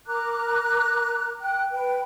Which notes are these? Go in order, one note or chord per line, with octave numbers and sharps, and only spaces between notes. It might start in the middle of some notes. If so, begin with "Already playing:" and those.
A#4 A#5 D6 F#6
G5 F#6
B4 G5